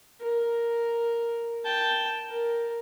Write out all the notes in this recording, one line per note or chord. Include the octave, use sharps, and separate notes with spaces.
A#4
G5 A5
A#4